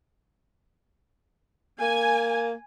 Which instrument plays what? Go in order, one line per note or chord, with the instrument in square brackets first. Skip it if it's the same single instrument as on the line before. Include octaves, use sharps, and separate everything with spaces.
[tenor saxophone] A#3 [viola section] G#5